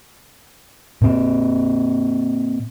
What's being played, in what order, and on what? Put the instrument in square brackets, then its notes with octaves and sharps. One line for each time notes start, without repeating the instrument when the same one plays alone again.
[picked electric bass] A#2 C4